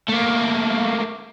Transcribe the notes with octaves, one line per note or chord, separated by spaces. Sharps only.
A3 A#3